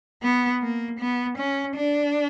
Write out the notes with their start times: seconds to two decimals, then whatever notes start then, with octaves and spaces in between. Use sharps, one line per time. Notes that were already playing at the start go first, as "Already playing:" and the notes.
0.23 B3
0.62 A#3
0.99 B3
1.38 C#4
1.76 D4